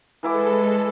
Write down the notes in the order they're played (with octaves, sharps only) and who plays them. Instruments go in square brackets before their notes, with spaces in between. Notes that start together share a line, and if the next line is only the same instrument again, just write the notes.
[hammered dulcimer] E3 E4 D6 [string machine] G#3 A4